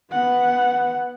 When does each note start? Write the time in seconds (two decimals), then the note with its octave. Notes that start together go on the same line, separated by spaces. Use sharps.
0.11 B3 F#5